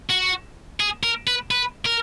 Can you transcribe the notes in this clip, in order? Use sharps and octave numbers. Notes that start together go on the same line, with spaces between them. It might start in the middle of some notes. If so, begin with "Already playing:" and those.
F#4
G#4
A#4
B4
B4
A#4